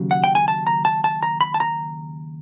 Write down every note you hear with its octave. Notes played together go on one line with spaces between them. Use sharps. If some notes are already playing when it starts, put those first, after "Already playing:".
Already playing: D#2 C#3 F#3
F#5
G5
G#5
A5
A#5
A5
A5
A#5
B5
A5
A#5